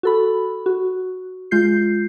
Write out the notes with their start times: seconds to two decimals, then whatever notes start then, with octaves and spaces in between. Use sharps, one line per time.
0.03 F#4 A4 B5
0.66 F#4
1.51 G#3 F4 G6 C7